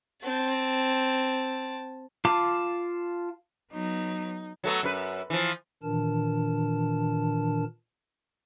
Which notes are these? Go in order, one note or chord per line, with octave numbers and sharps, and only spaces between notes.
C4 A5
F4 F5 A5 D6
F#3 B3 D#4
F#3 A3 B3
F#2 B4
E3 F3
A#2 D#3 E3 D4 A#4 A5